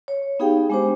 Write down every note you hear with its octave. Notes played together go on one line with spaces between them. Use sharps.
C#5
B3 D#4 G4 G#4 F5 G5
G#3 B3 D4 G4 C5